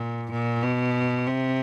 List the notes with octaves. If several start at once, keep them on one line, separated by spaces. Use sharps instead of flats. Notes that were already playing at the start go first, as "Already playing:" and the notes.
Already playing: A#2
A#2
B2
C3